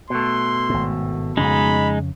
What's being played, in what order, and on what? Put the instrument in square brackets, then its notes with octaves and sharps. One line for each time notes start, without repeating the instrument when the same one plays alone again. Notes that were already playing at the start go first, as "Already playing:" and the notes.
[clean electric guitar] B2 A3 [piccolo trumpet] C6
[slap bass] G#1 A2
[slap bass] F2 C#3 C#4 [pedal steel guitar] G#3 D#4 [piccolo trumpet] B5